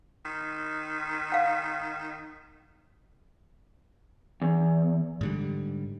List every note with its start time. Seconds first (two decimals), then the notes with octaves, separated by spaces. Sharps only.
0.25 D#3
1.32 F5 F#5
4.42 E2
5.21 G#2 D3 G3